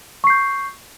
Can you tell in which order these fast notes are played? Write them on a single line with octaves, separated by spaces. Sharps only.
C#6 C7 G6